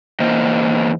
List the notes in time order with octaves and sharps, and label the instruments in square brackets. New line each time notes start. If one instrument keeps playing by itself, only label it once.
[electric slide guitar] E2 A#3 C5 D#5